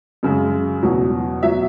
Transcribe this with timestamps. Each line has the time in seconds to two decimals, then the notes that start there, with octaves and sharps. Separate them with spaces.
0.23 F#2 C#3 G#3
0.83 E2 B2 F#3
1.43 B2 F#3 E5